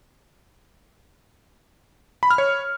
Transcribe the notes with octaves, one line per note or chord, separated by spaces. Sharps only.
B5
F6
C#5